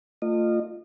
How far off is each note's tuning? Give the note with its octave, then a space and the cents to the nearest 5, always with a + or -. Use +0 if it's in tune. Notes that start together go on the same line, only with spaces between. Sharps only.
A3 +40 F4 +0 D#5 -30